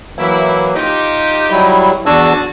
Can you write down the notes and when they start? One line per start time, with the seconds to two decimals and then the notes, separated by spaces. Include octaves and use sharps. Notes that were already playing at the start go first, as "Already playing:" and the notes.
0.19 E3 F#3 A#3 E4
0.76 D#4 F4 G4
1.51 F#3 G3 E4
2.06 E2 D4 F#4 G#4 A5 E6